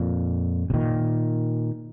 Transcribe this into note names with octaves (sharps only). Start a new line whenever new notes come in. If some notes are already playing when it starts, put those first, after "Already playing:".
Already playing: F2 A#2
C3
A#2 D#3